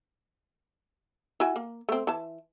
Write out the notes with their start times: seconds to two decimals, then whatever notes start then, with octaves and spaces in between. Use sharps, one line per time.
1.40 E4 F#4 G#5
1.56 A#3
1.89 A3 C4
2.07 E3 A5